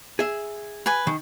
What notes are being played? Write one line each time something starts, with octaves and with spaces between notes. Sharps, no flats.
G#4 E5
B4 G#5
D#3